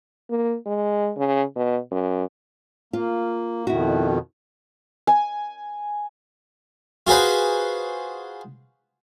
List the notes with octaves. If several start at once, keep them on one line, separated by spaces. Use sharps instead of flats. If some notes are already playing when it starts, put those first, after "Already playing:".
A#3
G#3
C#3
B2
F#2
A#3 F4
F2 B2 D#3 E4 F#4
G#5
F4 F#4 G#4 B4 C5